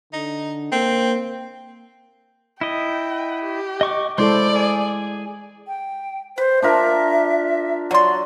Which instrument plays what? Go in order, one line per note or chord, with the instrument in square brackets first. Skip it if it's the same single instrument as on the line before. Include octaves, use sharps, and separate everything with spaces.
[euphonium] D3 [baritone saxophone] D#4
[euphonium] A#3 [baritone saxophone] C4
[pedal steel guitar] E4 D#5 [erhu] G5
[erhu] G4
[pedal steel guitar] D#5 C#6 D6
[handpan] G#3 E4 A4 [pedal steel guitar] C5 C6 [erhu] D5
[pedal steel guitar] G#4
[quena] G5
[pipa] B4 [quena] C5
[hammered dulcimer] D4 F4 A#4 [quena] E5
[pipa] D3 C6 [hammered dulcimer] F#3 [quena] D5